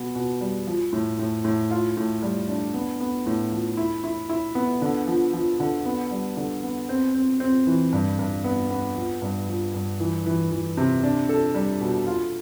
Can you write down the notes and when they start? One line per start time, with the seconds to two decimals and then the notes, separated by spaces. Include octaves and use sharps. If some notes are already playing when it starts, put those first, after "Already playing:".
Already playing: B2 B3
0.15 B2
0.41 G3
0.67 F3
0.93 A2
1.19 A2
1.45 A2
1.71 F4
1.97 A2
2.22 G3
2.48 D4
2.74 B3
3.01 B3
3.26 A2
3.52 F3
3.77 E4
4.04 E4
4.29 E4
4.55 B3
4.82 D3
5.07 F3
5.33 F3
5.60 D3
5.85 B3
6.11 G3
6.37 D3
6.63 B3
6.89 C4
7.15 C4
7.40 C4
7.67 E3
7.92 G2
8.19 G2
8.44 B3
8.70 B3
8.96 F3
9.22 G2
9.48 F3
9.74 G2
10.00 E3
10.26 E3
10.52 E3
10.77 C3
11.03 D4
11.29 A4
11.55 G3
11.81 B2
12.07 F4